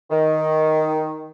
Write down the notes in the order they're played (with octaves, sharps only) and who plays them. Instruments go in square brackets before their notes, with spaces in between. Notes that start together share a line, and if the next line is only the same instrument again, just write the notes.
[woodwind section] D#3